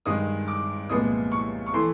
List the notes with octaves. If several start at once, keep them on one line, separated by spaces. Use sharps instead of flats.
G2 D#3 G#3 D#6
D6
C2 A#2 F3 G#3 B3 D#6
C#6
C#6
E3 A3 C6